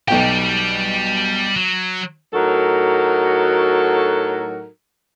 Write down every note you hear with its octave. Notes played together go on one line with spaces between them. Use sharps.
B1 B2 G3 G4 G5
F#3
A2 F#3 D#4 F#4 A4 A#4